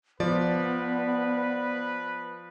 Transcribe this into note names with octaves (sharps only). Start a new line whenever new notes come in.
F3 B3 B4 D5